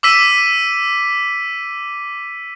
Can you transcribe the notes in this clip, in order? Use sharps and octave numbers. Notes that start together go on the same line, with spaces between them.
D6 E6 B6 D#7